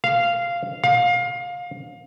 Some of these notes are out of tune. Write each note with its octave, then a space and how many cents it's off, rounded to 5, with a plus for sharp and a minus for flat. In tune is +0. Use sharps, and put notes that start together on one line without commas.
F5 -10
F5 +25